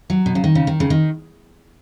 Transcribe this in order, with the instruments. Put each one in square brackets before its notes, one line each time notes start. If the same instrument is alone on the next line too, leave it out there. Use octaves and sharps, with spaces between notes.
[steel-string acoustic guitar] F#3
B2
C#3
D#3
C#3
D#3
C#3
D#3